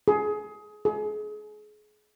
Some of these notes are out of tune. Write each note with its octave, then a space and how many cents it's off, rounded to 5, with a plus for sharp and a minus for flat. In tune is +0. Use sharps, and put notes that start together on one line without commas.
G#4 +20
G#4 +30